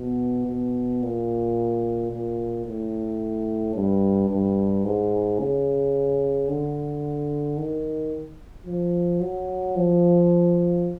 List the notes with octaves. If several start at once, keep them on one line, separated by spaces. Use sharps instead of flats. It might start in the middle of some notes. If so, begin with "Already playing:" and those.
Already playing: B2
B2
A#2
A#2
A2
G2
G2
G#2
C#3
D3
D#3
F3
F#3
F3